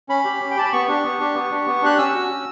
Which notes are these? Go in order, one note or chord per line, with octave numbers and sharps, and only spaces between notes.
C#4 B5
G4
C#4
G5
G4 A5
B5
B3 C#6
D4 G4
B3
D4 G4
B3
D4 G4
B3
D4 G4 F#6
C#4 E6
F#4
C#4